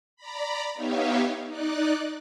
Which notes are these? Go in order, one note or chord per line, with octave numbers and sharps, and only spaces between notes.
D5 A#5 B5
B3 D#4 G4 C#5 E5 F5
D#4 D5 F#6